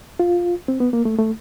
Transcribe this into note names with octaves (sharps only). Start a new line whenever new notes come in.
F4
C4
B3
A#3
A3
A3